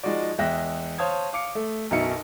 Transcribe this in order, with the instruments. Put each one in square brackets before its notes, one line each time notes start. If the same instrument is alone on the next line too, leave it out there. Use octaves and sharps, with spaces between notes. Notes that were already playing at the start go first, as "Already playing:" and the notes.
[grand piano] F3 G#3 D#4 F#4 D5
E2 G#3 E5 G5 F#6 A#6
C5 C#5 F5 A5 D#6 G#6
F5 D6 C#7
A3
B1 F#2 B2 D#4 E5 C#7